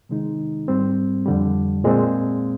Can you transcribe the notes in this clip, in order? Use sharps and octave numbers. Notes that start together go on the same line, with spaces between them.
C3 D#3 G#3 D#4
G#2 G3 C4
F2 D3 G3
A#2 G#3 C4